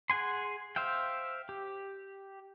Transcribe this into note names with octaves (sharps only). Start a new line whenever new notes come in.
G#4 F#5 G#5 C6
C5 E5 F5 G5
G4